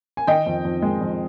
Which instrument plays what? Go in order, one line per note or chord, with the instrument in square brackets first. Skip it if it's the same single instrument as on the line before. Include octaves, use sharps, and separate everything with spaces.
[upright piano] G#5
D#3 D#5 G5
F2
F2
G#3
F2